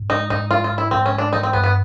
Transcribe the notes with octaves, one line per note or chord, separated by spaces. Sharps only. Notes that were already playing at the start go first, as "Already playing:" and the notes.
Already playing: G#2
G#3 D#4
G#2 D#4
G#2 F4
F4
G#3
E4
G#2 C4
C#4
G#2
D4
E3 D#4
C4
G2 B3
B3